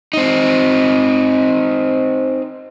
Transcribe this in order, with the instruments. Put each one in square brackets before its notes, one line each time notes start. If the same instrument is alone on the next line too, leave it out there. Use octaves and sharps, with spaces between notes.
[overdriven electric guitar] C4 D#4